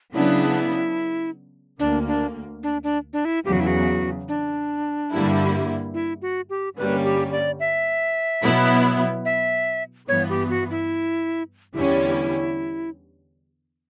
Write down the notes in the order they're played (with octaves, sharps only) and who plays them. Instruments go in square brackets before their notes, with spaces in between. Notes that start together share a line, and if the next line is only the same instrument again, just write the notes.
[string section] C#3 F#3 B3 D4 [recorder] E4
[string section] D2 D3 A#3 [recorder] D4
[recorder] D4
D4
D4
D4
E4
[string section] E2 C#3 F#3 [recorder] G4
[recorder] F#4
E4
F#4
D4
[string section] G2 D3 G3 A#3 E4
[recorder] E4
F#4
G4
[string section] G2 D3 G3 A#3 C#4 [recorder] B4
[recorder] G4
D5
E5
[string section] B2 F#3 B3 E4
[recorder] E5
[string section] G2 E3 B3 [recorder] C#5
[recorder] G4
F#4
E4
[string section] E2 D3 G3 C#4 [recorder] E4